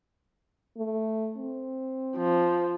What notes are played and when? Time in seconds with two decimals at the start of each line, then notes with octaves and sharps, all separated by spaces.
0.78 A3
1.37 C4
2.16 F3